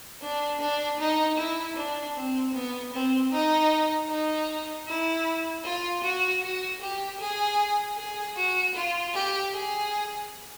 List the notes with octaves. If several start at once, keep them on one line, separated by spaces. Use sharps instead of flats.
D4
D4
D#4
E4
D4
C4
B3
C4
D#4
D#4
E4
F4
F#4
F#4
G4
G#4
G#4
F#4
F4
G4
G#4